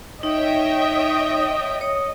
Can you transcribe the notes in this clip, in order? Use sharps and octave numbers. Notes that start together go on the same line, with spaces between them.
D#4 C#5 D#5 E5 G5
C#5 D#6